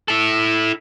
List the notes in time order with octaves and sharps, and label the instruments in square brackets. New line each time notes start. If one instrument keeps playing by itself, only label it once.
[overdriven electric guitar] E4 A4